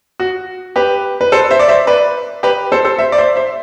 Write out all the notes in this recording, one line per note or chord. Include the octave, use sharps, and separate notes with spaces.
F#4
G4 B4
B4
A4 C5
C5 E5
D5
C5 E5
B4 D5
G4 B4
A4 C5
A4 C5
C5 E5
D5
C5 E5
C5 E5